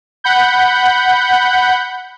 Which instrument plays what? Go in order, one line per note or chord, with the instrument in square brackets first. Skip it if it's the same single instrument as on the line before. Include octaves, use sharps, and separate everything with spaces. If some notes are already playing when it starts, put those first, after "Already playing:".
[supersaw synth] F#5 B5 G6